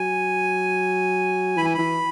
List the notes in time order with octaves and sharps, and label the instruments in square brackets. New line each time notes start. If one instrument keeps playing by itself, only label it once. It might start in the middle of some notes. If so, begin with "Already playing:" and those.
Already playing: [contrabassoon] F#3 [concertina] G#5
[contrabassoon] E3 [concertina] B5
[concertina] G#5
[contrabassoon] E3 [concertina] B5